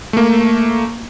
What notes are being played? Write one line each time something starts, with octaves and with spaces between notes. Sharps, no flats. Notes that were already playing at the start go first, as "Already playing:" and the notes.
A3 A#3